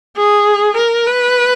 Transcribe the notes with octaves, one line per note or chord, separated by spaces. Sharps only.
G#4
A#4
B4